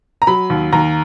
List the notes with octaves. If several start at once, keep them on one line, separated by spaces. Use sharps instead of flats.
A#5
F#3 B5
D#2
D#2 A#5